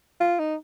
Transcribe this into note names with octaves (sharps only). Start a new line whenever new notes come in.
F4
D#4